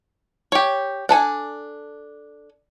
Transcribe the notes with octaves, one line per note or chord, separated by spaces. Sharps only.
G4 C#5
D4 A4 G#5